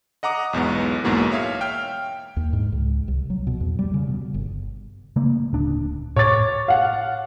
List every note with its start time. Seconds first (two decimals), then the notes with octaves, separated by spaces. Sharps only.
0.23 D#5 F#5 A#5 D6 D#6
0.53 B1 E2 G#2 B3
1.04 B1 E2 G#2 B2 A#3
1.32 C#5 E5 F5
1.61 G5 F6
2.37 D#2
2.53 G#2
2.72 C#2
3.08 C2
3.30 F#3
3.47 B2
3.61 E2
3.79 G3
3.94 C#3
4.07 B2
4.34 G1
5.16 C#3 A3 A#3
5.53 D1 D4
6.16 A2 C#5 D6 A6
6.68 F5 F#5